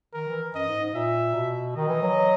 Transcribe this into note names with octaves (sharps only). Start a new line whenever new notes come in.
D#3 A#4
E3
F#2 D#5
G#2
G#2
A#2 E5
B2
D#3 D#5
E3
F#3